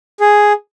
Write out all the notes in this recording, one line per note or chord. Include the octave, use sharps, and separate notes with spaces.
G#4